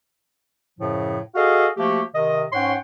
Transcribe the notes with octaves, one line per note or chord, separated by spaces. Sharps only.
F#2 A2 C#3 F3
F#4 G#4 A4 D#5 F5
F3 A3 A#3 F#4 G4
C3 D#3 D#5
G#2 C#4 C#5 F#5 G5 C6